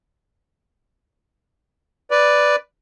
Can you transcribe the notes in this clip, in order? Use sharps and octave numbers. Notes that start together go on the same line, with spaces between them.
B4 D5